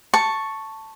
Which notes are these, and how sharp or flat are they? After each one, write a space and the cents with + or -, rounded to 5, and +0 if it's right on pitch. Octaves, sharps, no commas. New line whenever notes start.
A5 +5 C#6 +0